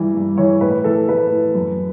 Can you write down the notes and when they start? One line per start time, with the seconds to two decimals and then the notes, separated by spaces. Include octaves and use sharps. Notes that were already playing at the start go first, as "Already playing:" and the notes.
Already playing: G2 E3
0.14 G2
0.37 E3 C#5
0.61 A2 B4
0.84 E3 A4
1.09 A2 B4
1.32 E3
1.54 F#2